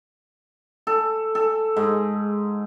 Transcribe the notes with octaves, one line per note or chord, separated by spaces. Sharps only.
A4
A4
G#2